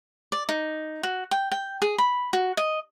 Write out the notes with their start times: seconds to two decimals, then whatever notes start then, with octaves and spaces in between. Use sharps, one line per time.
0.32 D5
0.49 D#4
1.03 F#4
1.31 G5
1.52 G5
1.82 G#4
1.98 B5
2.33 F#4
2.57 D#5